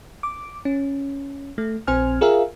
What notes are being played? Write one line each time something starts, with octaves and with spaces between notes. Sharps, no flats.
D6
C#4
A3
A#1 C4 C5 G#5 F6
F4 G#4 A#4 E5 F5